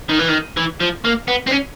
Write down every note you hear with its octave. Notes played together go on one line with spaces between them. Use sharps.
D#3
E3
D#3
E3
F3
A#3
B3
C4
C#4